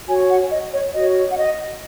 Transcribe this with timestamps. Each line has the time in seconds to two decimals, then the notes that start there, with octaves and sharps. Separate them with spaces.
0.08 F#4 C#5 G#5
0.29 F#5
0.51 D#5
0.72 C#5
0.93 F#4 C#5 D#5
1.31 F#5
1.35 D#5